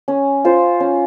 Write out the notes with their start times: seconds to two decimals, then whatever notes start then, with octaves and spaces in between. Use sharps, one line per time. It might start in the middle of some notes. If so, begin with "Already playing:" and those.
0.08 C#4
0.45 F4 C5
0.80 C#4